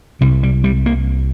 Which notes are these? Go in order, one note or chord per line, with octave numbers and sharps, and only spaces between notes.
C2 C3 G3
G3
G3
A#3